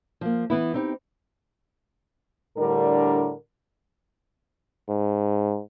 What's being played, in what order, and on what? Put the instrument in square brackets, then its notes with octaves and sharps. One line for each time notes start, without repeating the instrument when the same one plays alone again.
[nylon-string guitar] F3 A#3
E3 B3 E4
C4 D#4 G4
[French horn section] A2 D3 G3 D4 A#4
[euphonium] G#2